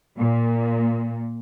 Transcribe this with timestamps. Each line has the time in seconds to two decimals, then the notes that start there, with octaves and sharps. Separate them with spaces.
0.18 A#2